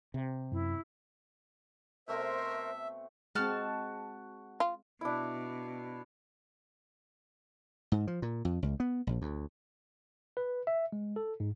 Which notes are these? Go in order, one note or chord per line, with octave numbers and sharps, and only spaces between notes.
C3
F#2 E4
B2 A3 C4 A#4 C5 E5
G#3 C4 F#4 A5 F6
F4
B2 D4 E4
G#2
F3
A#2
F2
C#2
B3
A#1
D2
B4
E5
G#3
A4
G#2